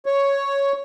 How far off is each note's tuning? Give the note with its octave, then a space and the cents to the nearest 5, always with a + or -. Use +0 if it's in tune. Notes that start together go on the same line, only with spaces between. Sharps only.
C#5 +0